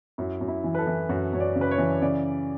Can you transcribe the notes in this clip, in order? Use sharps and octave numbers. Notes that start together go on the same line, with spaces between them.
F#2 E4
F#2
E4
E3
B4
A4
E3
F#2 F#4
F#2 C#5
D5
C#3
B4
C#5
E3
C#3 D5